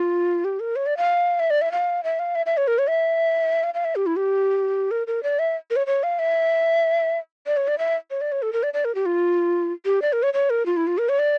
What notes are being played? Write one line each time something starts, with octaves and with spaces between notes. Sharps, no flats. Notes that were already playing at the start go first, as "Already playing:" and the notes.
Already playing: F4
G4
A#4
C#5
D5
F5
E5
D5
E5
F5
E5
F5
E5
E5
C#5
A#4
C#5
E5
F5
F5
E5
G4
E4
G4
A#4
A#4
D5
E5
A#4
C#5
C#5
F5
E5
D5
C#5
D5
E5
C#5
D5
C#5
A4
A#4
D5
D5
A#4
G4
F4
G4
D5
A#4
C#5
C#5
A#4
F4
E4
F4
A#4
C#5
D5